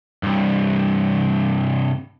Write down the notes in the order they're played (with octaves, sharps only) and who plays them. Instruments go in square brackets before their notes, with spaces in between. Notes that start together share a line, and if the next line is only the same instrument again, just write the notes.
[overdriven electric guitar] C2 G2